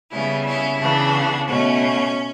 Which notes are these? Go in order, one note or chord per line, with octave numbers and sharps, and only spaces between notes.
C#3 G3 B3 C#4 E4
C#4 E4
C#3 E3 B3 D4
B2 A3 C#4